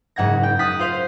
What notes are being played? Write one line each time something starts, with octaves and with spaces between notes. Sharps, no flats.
F#1 G#2 F#5 G#6 A#6
G5
D#6 F#6 A6 B6
F4 C5 F5